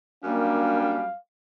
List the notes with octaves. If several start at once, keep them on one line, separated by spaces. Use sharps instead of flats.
F#2 G3 A#3 D4 F5